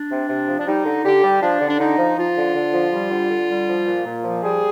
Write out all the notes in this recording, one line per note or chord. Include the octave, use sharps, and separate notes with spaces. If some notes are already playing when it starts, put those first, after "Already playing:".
Already playing: D4
C3
C3
F3
D4
G3 D#4
D3
D3 G4
G3
F3 D4
D3
D4
D3 D#4
F3
F3 F4
D3
D3
F3
G3
D3
D3
G3
F3
A#2
A#2
F3
G3 G#4